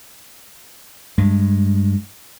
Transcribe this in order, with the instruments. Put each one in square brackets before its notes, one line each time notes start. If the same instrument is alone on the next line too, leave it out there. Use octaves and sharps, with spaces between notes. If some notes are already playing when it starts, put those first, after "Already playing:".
[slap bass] G2 G#3